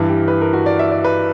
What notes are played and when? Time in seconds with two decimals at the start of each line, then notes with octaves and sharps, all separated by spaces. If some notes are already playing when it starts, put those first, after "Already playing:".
Already playing: G2 E3
0.09 G4
0.28 B4
0.41 A#4
0.53 F#4
0.66 D5
0.79 E5
0.91 D5
1.05 B4